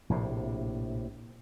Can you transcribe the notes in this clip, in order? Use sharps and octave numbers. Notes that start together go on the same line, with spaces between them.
A#1 A2 C3